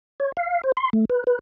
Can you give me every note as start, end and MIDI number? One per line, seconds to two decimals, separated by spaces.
0.20 0.32 73
0.37 0.61 77
0.64 0.72 72
0.77 0.90 84
0.93 1.05 57
1.10 1.24 71
1.27 1.39 71